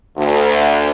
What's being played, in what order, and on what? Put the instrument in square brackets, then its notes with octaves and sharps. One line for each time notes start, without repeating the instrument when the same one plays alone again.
[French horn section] D2